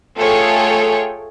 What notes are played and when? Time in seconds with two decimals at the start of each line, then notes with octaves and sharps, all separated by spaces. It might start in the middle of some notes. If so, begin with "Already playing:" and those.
0.17 A3 F4 G#4 A4 C#5 G5